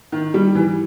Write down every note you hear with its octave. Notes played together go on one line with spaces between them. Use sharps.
D#3
G3
E3